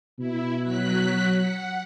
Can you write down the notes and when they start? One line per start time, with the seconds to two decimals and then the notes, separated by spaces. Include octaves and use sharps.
0.19 B2 E4
0.62 F#3 F#6 B6
1.32 F#5